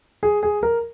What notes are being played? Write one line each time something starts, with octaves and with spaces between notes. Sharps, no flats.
G#4
G#4
A#4